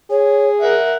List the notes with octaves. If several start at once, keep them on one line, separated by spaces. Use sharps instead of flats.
G#4 C#5
A#4 D5 E5 F#5